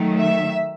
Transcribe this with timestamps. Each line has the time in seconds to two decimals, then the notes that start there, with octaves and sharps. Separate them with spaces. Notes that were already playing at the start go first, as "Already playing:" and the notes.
Already playing: D#3 F#3 A3
0.19 E5